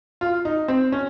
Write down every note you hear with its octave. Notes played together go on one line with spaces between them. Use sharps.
F4
D#4
C4
C#4